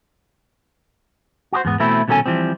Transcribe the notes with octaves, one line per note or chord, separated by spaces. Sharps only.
F#4 G4 C5
E2 G#2 B3
B2 E3 A3 C4 E4
C2 B2 D#3 C#4 A4 G#5
E3 F3 G3 C4